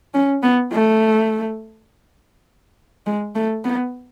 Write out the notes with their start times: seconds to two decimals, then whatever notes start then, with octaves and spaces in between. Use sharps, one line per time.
0.14 C#4
0.43 B3
0.72 A3
3.07 G#3
3.35 A3
3.65 B3